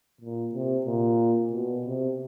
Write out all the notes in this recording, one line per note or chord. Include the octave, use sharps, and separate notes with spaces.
A#2
C3
A#2
B2
C3